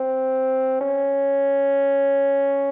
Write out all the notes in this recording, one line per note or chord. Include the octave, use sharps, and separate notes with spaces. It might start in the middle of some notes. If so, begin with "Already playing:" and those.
Already playing: C4
C#4